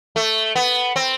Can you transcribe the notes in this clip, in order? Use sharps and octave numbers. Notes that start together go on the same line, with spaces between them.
A3
B3
C4